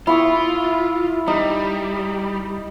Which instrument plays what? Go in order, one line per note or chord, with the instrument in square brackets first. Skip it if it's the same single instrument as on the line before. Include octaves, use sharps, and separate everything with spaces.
[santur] E4 C#6 D#6 [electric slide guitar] F4
[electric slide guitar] G3 [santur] D#4